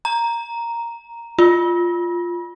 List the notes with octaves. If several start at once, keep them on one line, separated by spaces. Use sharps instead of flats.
A#5
F4